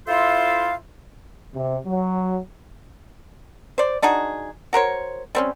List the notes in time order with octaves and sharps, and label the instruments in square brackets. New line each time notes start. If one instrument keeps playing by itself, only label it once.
[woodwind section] E4 F4 A4 C5 E5 F5
[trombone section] C3
F#3
[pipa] C5 D5
D4 D#4 F#4 G#4
F#4 A#4 C5 C#5
G3 C4 C#4